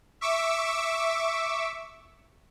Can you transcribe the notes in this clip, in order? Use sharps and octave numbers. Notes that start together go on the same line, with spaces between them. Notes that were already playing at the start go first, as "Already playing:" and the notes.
E5 C#6 D6 E6